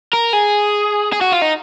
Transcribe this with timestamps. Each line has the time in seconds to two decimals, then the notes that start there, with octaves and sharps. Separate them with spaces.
0.13 A#4
0.33 G#4
1.13 G#4
1.21 F#4
1.32 F4
1.42 D#4